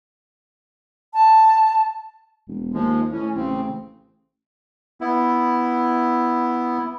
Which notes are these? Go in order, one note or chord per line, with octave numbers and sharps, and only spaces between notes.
A5
E1
D#2 F3 G#3
A2 E3 C#4
A1 C#3 C4
B3 E4